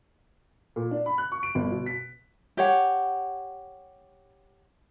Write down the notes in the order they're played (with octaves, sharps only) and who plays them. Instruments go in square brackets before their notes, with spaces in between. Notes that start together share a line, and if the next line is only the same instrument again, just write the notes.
[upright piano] A#2
D4
B5
F#6
C#6
D7
G1
B2
B6
[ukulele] G4 C#5 F#5